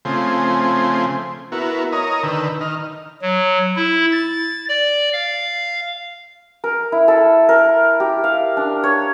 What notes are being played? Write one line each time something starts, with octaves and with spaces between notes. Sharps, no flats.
C#3 F3 A3 C4 G#5 C6
B3 E4 F#4 A#4
A#4 C#5 D#5 A#5 D#6
D3 D#3 B4 G5 E6
D#3 D#5 F6
F#3
E4
A6
D5
F5
A#4
E4
A4
A#4
G4
F5
D4
C#5